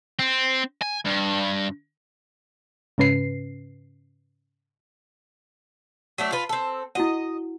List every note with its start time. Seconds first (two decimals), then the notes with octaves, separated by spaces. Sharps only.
0.19 C4
0.81 G#5
1.05 G2
2.98 G#2 C#3 C#4 B4 C7
6.18 F#3 A3 D4
6.32 F4 B4
6.49 C4 A4
6.95 E4 F#4 D#5 F#5